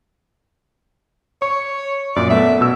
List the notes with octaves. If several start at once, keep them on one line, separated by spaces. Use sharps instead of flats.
C#5 C#6
F#2 A#2 D5
A3 B3 E5
B2 E6